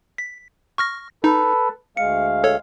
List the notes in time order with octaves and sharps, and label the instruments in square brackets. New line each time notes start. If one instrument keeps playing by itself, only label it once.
[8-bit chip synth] B6
C#6 F6 A#6
[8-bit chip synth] D#4 [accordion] A4 B4
[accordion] D2 G#3 F5 [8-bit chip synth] C#7
[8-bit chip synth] A4 C#5